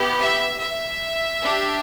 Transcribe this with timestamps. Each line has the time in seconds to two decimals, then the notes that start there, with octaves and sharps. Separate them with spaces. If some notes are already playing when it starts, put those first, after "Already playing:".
Already playing: B3 E4 G4
0.18 E5
0.59 E5
1.43 D4 G4